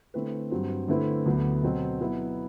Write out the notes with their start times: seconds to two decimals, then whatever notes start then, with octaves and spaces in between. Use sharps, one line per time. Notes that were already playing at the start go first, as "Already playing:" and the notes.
0.14 D3 A3 C4 E4 B4
0.51 G2 F#3 C4
0.88 D3 A3 C4 E4 B4
1.26 D2 D3 F#3 B3
1.63 B2 F#3 C4
2.01 F#3 B3 E4